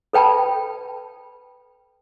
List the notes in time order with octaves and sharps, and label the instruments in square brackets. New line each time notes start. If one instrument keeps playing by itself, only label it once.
[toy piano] A4 B4 G5 A5 B5